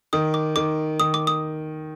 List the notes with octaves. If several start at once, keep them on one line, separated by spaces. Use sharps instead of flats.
D#3 D#6
D6
D#3 D6
D#3 D#6
D6
D#6